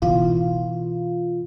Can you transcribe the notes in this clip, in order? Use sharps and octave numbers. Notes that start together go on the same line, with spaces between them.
B2 E3 F4